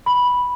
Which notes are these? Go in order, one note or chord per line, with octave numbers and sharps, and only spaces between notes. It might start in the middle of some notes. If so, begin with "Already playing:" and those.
B5